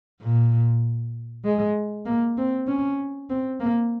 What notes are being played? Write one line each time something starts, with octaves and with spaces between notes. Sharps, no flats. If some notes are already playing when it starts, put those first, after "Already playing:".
A#2
G#3
A#3
C4
C#4
C4
A#3